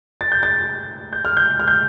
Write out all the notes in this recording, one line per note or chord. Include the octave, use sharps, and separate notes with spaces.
A6
G6
A6
G6
F6
G6
F6
G6